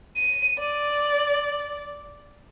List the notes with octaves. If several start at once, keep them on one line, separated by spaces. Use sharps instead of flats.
D#7
D5